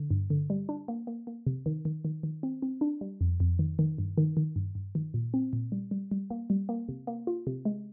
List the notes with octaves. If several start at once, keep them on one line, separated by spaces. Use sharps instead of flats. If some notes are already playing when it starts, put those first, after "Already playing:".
Already playing: D3
G2
D3
G3
D4
A#3
A#3
A#3
C3
D#3
D#3
D#3
D#3
C4
C4
D4
G3
F2
F2
D#3
D#3
G2
D#3
D#3
G2
G2
D#3
A#2
C4
A#2
G3
G3
G3
A#3
G3
A#3
C3
A#3
F4
C3
G#3